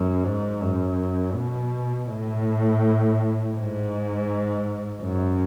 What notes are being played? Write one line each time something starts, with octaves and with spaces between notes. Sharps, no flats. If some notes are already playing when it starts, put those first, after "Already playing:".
Already playing: F#2
G#2
F#2
B2
A2
G#2
F#2